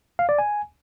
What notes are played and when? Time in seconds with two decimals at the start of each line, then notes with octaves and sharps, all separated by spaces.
0.19 F5
0.29 D5
0.39 G#5